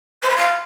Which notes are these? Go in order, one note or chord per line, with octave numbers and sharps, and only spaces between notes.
C5
B5
F5